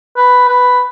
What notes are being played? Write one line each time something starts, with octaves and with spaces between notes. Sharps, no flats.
B4
B4